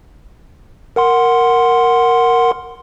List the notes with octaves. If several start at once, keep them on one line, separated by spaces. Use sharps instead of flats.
A#4 F#5 C6